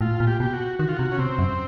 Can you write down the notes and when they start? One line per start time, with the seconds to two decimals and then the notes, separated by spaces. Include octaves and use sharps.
0.01 A2 F4
0.20 A#2
0.27 G4
0.40 B2 G4
0.53 F#4
0.79 D#3 F#4
0.88 F4
0.97 C3 F#4
1.12 C#4
1.19 C3 C4
1.39 F#2